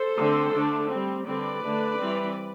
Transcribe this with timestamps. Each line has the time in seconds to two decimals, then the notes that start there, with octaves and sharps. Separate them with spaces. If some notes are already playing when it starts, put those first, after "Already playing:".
Already playing: A4 C5
0.18 D3 A3 C4
0.54 D3 A3 D4
0.90 C4
0.95 G3
1.26 D3 G3 C4 B4 D5
1.63 D3 A3 D4
1.98 E3 G3 C4